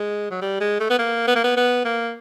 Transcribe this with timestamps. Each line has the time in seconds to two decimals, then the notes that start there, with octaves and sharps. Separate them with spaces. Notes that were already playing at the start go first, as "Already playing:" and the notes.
Already playing: G#3
0.31 F#3
0.41 G3
0.60 G#3
0.80 A3
0.90 B3
0.99 A#3
1.28 B3
1.35 A#3
1.44 B3
1.57 B3
1.85 A#3